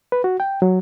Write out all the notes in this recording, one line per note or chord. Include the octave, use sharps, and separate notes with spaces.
B4
F#4
G5
F#3